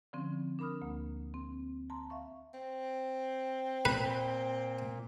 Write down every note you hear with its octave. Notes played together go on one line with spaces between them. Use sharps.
D3 F3 C4 C#4
D4 A#4 B5 D#6 F6
D2 A#3
C4
A5 A#5 C6
E5 F5 C#6
C4
A#2 B4